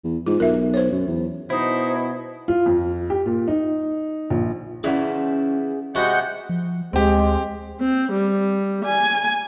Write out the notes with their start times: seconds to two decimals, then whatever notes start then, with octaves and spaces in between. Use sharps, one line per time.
0.04 E2
0.26 G#2 F4
0.40 B1 A#4 E5
0.74 C5 C#5
0.92 F#2
1.07 E2
1.50 B2 D#4 E4 C5
2.48 F4
2.66 F2
3.10 G4
3.26 A#2
3.48 D#4
4.30 A#1
4.84 C#3 E3 C#4 G#4 D5 E5 F#5
5.95 C3 G#3 F#4 F#5 A5 B5 G6
6.49 F3
6.93 D2 G#3 C4 G4
7.80 C4
8.13 G3
8.85 G#5